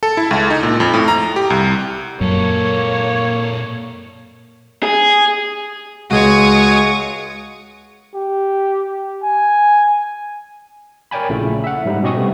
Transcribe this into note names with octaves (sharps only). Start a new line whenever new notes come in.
A4
E4
C#2
D#4
A#2
F2
A2
A#5
G4
C2
F#2 A#2 A#3 A4 C#5
G#4
C#2 G#3 F#4 G#4 C#5 C#6 D#6
G4
G#5
A#4 C#5 D5 G5 G#5 B5
A#1 A#2 C#3 A3 E4
E5 F#5
G#2 G3 D#4
B2 C#4 G4 D#5 C#6 D#6
C3 G3 A3 B3 C4